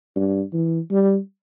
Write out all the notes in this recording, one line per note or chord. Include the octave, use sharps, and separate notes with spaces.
G2
E3
G3